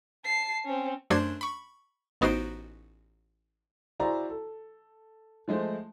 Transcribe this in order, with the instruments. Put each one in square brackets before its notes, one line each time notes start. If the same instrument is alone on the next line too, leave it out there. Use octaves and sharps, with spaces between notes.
[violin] A5 C7
C4 C#4
[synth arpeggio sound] F#2 A3 D4 C5 C6 G#6
B5 C#6
A1 B3 D#4 F#4 C5 D7
[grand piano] E4 F#4 G#4 C5 D5 A#5
A4
F3 G#3 A3 C5